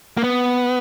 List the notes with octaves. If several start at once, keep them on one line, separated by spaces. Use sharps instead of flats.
A#3
B3